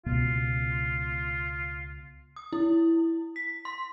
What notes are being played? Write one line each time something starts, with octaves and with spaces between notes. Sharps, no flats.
C#2 B2 B3 F4
D#6
E4
B6
C6